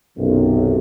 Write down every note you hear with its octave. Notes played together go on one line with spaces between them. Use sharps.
B1 F#2 C3